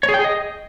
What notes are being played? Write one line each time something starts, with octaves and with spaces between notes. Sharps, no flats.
C#5
G#4
G5
G#4
D#5